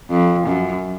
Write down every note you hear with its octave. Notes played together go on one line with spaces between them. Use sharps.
F2
F#2